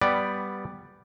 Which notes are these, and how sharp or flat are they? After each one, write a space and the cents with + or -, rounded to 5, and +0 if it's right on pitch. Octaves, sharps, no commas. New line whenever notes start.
G3 +0 B3 +0 D5 +5